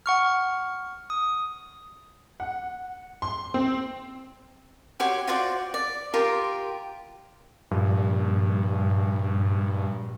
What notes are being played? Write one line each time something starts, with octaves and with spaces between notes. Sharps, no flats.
F#5 C#6 F6
D#6
F#5
C6
C4
F#4 G4 C#5 C6
F4 F#4 C5 D5
D5
F4 G4 A#4 C6
G2 A#2 F3 G3